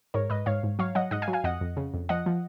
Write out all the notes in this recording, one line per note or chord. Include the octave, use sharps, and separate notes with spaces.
G#2 A#4 C#5
G#2 B4 D#5
G#2 C#5 F5
G#2
F#3 C#5 F5
F#3 D#5 F#5
G#2 D#5 F#5
F5 G#5
F#3
F5 G#5
F2 D#5 F#5
F2
C#3
F2
F3 D#5 F#5
F3